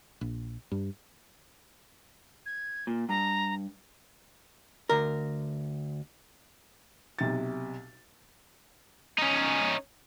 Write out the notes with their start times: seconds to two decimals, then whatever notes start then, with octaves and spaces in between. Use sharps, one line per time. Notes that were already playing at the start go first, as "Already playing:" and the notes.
0.21 A#1
0.72 G2
2.46 G#6
2.87 A#2
3.09 G2 A#5
4.89 D2 A#4
7.19 B1 C3 A6
9.18 C#4 D#4